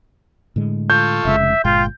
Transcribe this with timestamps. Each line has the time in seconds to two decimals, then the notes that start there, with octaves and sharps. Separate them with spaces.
0.56 A2 D3 G#3
0.90 F4 A4 C#6 G6
1.25 F1 C#3 G#3 E5
1.65 G1 A#2 G#3 F4 G5